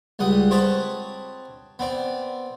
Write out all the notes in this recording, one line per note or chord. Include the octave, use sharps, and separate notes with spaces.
C#2 G3 F#5 D#6
C4 B4 C#5 D#5 A5 B5
B3 C4 D5